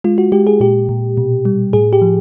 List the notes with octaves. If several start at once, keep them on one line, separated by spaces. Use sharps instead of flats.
G#3 F4
F#4
G#3 G4
G#4
A#2 G4
A#2
B2
G3
A2 G#4
G4
F3